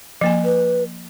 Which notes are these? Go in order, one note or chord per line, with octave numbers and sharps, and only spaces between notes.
F3 A#3 G#5
B4